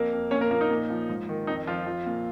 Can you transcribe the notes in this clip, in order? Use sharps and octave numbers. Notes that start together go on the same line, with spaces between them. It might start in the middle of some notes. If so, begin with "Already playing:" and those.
Already playing: F2 A#3 A#4
F2
A#2 C#4 C#5
A#3 A#4
F3 A#3 A#4
D#4
A#2
F3
G#2
D#3
F2 D#4
F2 F3 F4
F3
A#2